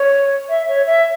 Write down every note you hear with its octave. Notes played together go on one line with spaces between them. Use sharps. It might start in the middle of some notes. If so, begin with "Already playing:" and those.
Already playing: C#5
E5
C#5
E5